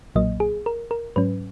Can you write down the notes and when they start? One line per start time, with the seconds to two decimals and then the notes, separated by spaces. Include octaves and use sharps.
0.15 B1 A#2 F#3 A#3 D#5
0.40 G#4
0.66 A#4
0.91 A#4
1.16 G#2 F#3 C#4 B4